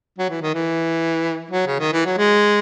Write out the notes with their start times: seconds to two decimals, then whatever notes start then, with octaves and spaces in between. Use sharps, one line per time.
0.18 F#3
0.30 E3
0.42 D#3
0.54 E3
1.51 F#3
1.67 C#3
1.79 D#3
1.93 E3
2.05 F#3
2.18 G#3